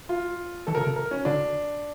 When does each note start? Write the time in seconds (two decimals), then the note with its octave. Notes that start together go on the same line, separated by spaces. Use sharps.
0.09 F4
0.67 E3 A4
0.75 A#4
0.77 D3
0.81 A4
0.87 C#3
0.96 A#4
1.11 C#4
1.25 D3 D4